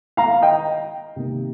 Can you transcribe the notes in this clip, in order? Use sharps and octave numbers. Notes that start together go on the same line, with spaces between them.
F5 A#5
D#5 G5
C3 D#3 A#3